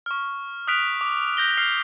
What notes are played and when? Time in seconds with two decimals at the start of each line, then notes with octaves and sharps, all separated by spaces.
0.06 C#6 F6
0.67 D#6 F6 F#6 B6 D7 F7
1.01 D6
1.37 G6 A#6 G7
1.57 F6 C7 F7 G7